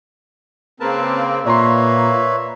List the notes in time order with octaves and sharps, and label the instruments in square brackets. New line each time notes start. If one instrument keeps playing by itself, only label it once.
[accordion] C#3 A#3 C4 [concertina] A#4 B4 A5
[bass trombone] A#2 [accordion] A#3 [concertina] B4 C#5 E5 [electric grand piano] D5 A#5 C6